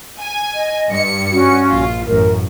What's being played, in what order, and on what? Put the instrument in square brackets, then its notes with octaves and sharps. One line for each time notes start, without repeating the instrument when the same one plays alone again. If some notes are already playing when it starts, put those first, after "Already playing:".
[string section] G#5
[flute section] D#5
[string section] G2 C#7
[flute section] C#4 F#4
[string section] A#1 F4
[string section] A1 F#2 [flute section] A#4